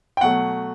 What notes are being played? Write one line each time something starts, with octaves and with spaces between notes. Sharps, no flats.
G5
B2 F#3 A3 F#5